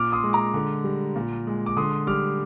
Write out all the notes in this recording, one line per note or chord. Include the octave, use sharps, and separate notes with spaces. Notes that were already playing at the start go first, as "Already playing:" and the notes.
Already playing: A#2 D6 F6
C6 D#6
G#3
A#5 D6
D3
G3
A#2
G#3
D6
D3 C6 D#6
G3 D6 F6